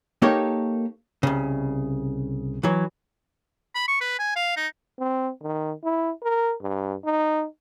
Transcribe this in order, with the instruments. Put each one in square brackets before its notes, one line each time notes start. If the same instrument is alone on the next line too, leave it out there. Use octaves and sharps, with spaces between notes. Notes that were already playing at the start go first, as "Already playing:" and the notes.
[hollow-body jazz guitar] A#3 D#4 G4 A4 A#4 C#5
C2 C#3
E3 F#3
[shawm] B5
C#6
B4
G#5
F5
D#4
[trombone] C4
D#3
E4
A#4
G2
D#4